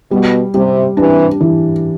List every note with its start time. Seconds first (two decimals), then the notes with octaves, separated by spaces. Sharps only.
0.11 B2 G3
0.54 C3 G3
0.97 C3 E3 D4
1.41 E3